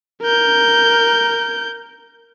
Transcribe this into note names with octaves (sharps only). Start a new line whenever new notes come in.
A#4 G6